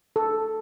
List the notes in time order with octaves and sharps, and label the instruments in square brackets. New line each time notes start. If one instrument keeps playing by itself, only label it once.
[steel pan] A4